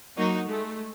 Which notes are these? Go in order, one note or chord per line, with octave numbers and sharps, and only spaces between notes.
F#3 A#3 D#4 F#4
G#3 A3